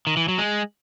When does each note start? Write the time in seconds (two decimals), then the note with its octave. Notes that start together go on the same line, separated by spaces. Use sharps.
0.07 D#3
0.17 E3
0.28 F#3
0.38 G#3